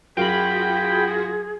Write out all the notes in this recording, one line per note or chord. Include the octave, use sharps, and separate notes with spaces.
F#2 F4 F#4 G#4 F5 G5 B5 A#6